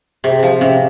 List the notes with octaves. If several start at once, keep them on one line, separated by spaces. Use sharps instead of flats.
C3 G#4
F3 G4
C3 C#4